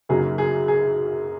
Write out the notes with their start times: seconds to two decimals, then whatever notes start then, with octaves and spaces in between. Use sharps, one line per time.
0.09 F#2 C#3 F#3 A#3 D#4 G#4
0.38 G#4
0.68 G#4